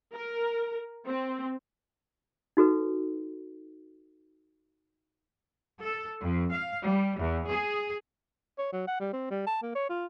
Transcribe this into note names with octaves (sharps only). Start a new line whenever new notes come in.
A#4
C4
D#4 F#4 A4 B4
A4
F2
F5
G3
E2
G#4
C#5
F#3
F#5
G3
C4
G3
A5
A#3
C#5
F4